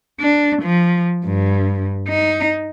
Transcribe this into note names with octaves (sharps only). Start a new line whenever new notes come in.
D4
F3
G2
D#4